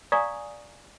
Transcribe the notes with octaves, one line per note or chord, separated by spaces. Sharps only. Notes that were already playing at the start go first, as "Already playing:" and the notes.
D5 F5 G#5 A#5 C#6 D#6